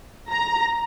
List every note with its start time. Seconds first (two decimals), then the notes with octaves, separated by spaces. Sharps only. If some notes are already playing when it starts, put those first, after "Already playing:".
0.30 A#5